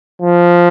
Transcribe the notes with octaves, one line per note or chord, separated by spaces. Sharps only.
F3